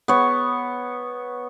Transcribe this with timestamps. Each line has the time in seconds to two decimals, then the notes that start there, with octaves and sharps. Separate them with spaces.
0.08 B3 C#5